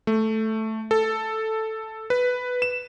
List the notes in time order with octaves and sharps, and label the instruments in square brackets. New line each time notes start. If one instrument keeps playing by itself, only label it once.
[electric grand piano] A3
A4
B4
E7